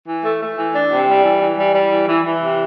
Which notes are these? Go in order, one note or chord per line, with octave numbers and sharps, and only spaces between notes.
E3
A3
A3
E3
D4
C3
G3
E3
E3
G3
G3
E3
E3
E3
C3